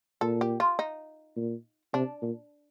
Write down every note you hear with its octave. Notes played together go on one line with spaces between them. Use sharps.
A#2 A4
G4
F4
D#4
A#2
C3 D4
A#2